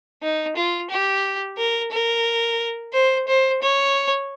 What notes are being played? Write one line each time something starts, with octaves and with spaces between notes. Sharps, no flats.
D#4
F4
G4
A#4
A#4
C5
C5
C#5